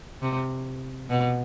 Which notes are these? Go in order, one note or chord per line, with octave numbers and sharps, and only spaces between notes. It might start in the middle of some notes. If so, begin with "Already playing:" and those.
C3
B2